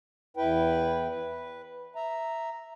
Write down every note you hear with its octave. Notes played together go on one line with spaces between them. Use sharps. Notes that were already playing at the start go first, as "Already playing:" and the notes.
E2 E4 B4 G5
B4
E5 A#5